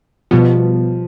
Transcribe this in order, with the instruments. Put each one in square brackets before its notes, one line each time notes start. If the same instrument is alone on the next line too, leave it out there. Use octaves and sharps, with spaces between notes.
[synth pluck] B2 G3 B3 [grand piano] F3